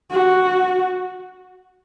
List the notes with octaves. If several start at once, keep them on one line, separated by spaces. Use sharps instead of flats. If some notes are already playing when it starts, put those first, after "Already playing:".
F#4